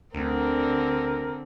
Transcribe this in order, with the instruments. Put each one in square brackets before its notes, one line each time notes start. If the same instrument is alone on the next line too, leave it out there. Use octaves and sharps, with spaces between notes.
[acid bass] D2 [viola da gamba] D3 C4 [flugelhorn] A#4